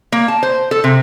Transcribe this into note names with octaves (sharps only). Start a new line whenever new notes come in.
A#3
A5
C5
A4
C3